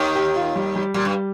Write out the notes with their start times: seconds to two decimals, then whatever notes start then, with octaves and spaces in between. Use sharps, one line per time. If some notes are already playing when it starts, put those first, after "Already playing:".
Already playing: D#2 D#3
0.15 G4
0.36 F4
0.55 G3
0.76 G3
0.94 A#2 G3
1.05 G2